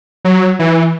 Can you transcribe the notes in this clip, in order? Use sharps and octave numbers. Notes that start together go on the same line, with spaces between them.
F#3
E3